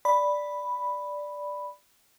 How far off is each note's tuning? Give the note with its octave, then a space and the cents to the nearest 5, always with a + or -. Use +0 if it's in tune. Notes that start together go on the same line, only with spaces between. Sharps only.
D5 +0 B5 +0